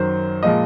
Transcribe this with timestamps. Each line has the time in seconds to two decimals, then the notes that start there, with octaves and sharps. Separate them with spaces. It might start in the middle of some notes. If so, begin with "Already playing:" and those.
Already playing: F#2 D#3 F#3 C5
0.43 A#2 F3 G#3 D#5